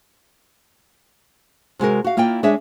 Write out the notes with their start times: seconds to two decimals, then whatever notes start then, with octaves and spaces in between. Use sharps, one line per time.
1.79 C3 G#3 F#4 A#4
2.04 F#4 F5
2.17 A#3 E4 F4 D5 G5
2.43 G#3 D4 G#4 C#5 E5